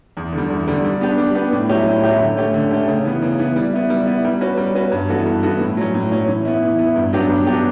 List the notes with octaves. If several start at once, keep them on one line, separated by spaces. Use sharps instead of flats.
E2
D3
G3
E2
D3 G3
G3
B3 D4 G4 B4
G3
B3 D4 G4 B4
A2
F#3 C#4 E4 G4
A2
F#3 C#4 E4 G4
D3
A3 C#4 G4
D3
A3 C#4 G4
C#3
E3 B3
C#3
E3 B3
G3
B3 E4
G3
B3 E4
G3
C#4 F#4 B4
G3
C#4 F#4 B4
G2
E3 B3 F#4 A4
G2
E3 B3 F#4 A4
A2
F#3 C#4
A2
F#3 C#4
E3
B3 E4
E3
B3 E4
G2
F#3 B3 D4 G4
G2
F#3 B3 D4 G4